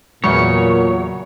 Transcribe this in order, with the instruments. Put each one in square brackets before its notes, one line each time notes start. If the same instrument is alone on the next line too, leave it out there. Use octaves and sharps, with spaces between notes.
[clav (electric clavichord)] E2 C#3 [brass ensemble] A#2 [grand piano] F#3 [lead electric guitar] C#5